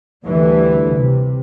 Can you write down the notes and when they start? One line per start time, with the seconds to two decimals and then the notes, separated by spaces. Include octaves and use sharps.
0.25 D2 D3 E3 G3
0.95 C3